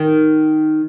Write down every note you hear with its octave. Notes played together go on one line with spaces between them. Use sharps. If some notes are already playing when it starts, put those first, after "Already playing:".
Already playing: D#3